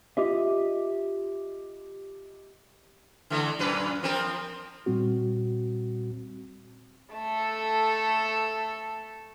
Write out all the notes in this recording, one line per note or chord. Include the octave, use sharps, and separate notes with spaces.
F4 G4 D#5 E5
D3 E3 A3
F#2 A#2 B4
F3 C4 A#4
A#2 G3 C4 F#4
A3 A4